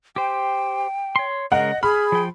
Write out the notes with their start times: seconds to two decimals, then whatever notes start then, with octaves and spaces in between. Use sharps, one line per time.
0.16 G4 C5 G5
1.16 C#5 C6
1.52 C#3 G#3 A#4 D#5 F#5
1.83 G#4 B5 F6
2.12 F3 G5